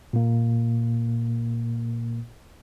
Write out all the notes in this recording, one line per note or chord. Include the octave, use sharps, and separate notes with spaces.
A#2 A#3